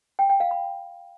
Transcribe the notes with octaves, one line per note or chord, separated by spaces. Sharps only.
G5
G5
F5
B5